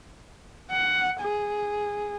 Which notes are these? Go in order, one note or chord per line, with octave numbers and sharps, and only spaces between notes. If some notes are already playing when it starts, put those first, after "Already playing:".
F#5
G#4